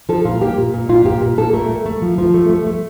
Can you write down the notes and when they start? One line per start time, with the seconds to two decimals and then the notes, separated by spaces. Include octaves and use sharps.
0.09 F3 A4
0.25 A#2 F4
0.41 A#3 G4
0.58 A#2
0.74 A#2
0.89 A#2 F4
1.05 A#2 G4
1.21 A#2
1.37 A#2 A4
1.53 A3 A#4
1.69 A3
1.86 A3
2.02 F3
2.18 F3
2.34 A3
2.50 A3
2.67 A3